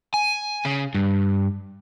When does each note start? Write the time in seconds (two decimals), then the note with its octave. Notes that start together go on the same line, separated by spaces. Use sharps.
0.14 G#5
0.65 C#3
0.95 G2